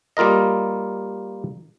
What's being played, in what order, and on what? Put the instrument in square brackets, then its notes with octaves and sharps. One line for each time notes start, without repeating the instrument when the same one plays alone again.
[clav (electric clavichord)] G3 A#3 F4 A#4 D#5